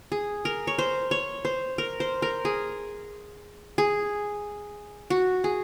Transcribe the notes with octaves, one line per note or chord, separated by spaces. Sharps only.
G#4
A#4
C#5
C5
C#5
C5
A#4
C5
A#4
G#4
G#4
F#4
G#4